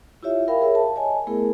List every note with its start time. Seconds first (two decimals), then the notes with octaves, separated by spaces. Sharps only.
0.23 E4 F4 G4 C#5 E5
0.48 A#4 E5 F5 G5 B5
0.61 G#4 A#4 C#5 E5
0.75 A5
0.96 C#5 D#5 G#5 A5
1.27 A3 B3 E4 G#4 A#4